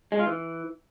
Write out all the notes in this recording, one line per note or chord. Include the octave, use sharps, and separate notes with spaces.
G#3
F4
E3